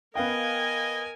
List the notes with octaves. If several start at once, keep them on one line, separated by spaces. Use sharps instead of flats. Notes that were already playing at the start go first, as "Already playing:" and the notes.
B3 A#4 D#5 F5 G5 G#5